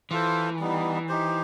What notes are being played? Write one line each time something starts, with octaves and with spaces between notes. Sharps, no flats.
E3 F4 A4 C5
G3 B3 D#4
D#4 G4 C5